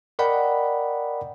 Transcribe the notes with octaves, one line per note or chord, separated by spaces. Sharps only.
A#4 D5 D#5 F#5 G5 B5